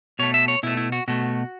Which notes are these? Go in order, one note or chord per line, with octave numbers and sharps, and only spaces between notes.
B2 A3 C#5
E5
C#5
B2 A3 E4
E4
F#4
B2 A3 F#4